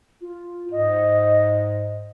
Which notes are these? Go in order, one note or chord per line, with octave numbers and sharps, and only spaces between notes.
F4
G#2 D#5